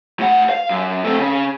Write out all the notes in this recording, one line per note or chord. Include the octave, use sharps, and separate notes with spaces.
A2 F#5
F5
F#2
A3 C4
C#3